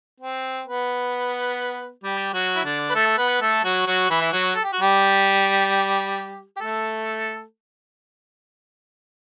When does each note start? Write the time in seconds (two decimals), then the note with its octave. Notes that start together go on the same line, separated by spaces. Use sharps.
0.20 C4
0.66 B3 B4
2.03 G3 G4
2.34 F#3 F#4
2.56 E4
2.65 D3 D4
2.90 B4
2.95 A3 A4
3.18 B3 B4
3.41 A3 A4
3.64 F#3 F#4
3.86 F#3 F#4
4.10 E3 E4
4.21 E4
4.32 F#3 F#4
4.55 A4
4.64 G4
4.73 F#4
4.81 G3 G4
6.57 G4
6.61 A3 A4